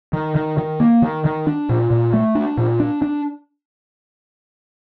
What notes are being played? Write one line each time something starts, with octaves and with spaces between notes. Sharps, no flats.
D#3
D#3
D#3
A#3
D#3
D#3
D4
A#2
A#2
A3
D4
A#2
D4
D4